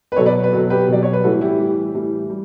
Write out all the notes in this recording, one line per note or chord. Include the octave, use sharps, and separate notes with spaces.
B4
B2 F#3 A4 C#5
B4 D5
B4
B2 F#3 A4
G4 B4
B2 F#3 D5
C#5
B4
A2 E3 G3 F#4 A4
E4 G4
A2 E3 G3
A2 E3 G3
G3